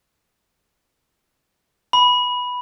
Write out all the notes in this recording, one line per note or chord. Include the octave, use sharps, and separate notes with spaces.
B5